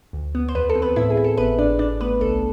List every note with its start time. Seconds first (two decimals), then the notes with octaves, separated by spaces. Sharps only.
0.13 D2
0.35 B3
0.48 C5
0.55 E2 B3 B4
0.69 A4
0.75 C4
0.82 B3 B4
0.96 A2 E4 E5
1.10 G#4
1.17 E4
1.24 A4
1.37 G#1 B3 B4
1.58 G#1 D4 D5
1.79 G#1 D4 D5
2.00 A3 B3 B4
2.21 C2 A4